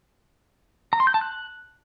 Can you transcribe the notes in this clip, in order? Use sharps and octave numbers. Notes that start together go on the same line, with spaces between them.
A#5
C6
G6
A5
F#6